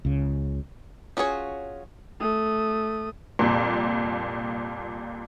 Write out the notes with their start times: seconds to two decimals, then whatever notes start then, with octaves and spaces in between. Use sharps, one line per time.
0.05 C#2 C#3
1.17 C#4 F4 F#4 G#4 C#5
2.20 A3 D#6
3.39 C2 F2 A#2